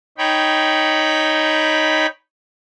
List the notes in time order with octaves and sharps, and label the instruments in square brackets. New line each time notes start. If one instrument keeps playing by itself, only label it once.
[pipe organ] D#4 C#5 G5 B5